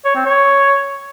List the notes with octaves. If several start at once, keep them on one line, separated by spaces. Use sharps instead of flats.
C#5
C4
C#5